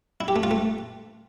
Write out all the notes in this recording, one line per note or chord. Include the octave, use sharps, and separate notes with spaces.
E4
G4
A3
F4
A3